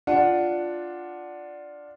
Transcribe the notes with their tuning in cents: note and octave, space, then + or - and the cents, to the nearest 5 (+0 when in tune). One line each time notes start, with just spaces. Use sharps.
D4 +0 F4 +5 F#5 +0